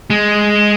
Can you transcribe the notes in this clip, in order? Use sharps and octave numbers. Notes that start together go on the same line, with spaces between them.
G#3